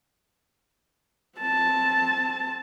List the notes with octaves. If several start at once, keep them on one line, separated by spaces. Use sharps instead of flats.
C4 A5